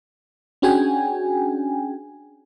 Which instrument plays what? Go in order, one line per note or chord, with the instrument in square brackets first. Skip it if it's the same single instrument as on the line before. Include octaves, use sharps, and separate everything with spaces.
[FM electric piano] C#4 D4 F#4 G#4 G5 G#5